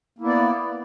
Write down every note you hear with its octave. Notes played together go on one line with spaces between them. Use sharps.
A#3 B3 E4 D5